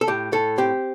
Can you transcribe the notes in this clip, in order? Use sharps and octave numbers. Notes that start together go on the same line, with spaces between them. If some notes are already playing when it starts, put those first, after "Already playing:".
A4
A2 G4
A2 A4
C4 G4